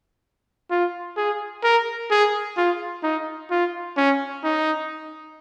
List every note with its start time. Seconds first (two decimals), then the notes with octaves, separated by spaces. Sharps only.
0.71 F4
1.17 G#4
1.64 A#4
2.11 G#4
2.57 F4
3.03 D#4
3.51 F4
3.97 C#4
4.44 D#4